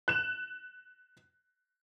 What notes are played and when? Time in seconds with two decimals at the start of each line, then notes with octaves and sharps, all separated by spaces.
0.08 F#6 E7